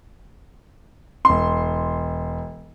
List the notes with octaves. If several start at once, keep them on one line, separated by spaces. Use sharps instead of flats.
E1 C6